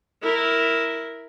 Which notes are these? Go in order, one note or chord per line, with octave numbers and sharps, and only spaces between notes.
E4 A#4